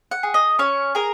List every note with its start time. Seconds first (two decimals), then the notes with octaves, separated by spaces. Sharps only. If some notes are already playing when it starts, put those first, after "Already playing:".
0.11 F#5
0.23 G#4
0.34 D#5
0.59 C#4 C#5
0.95 G#4 A#4